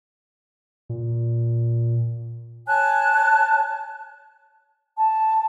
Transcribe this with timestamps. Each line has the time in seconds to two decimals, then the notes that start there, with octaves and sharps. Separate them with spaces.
0.90 A#2
2.66 C#5 G#5 A5 F#6
4.98 A5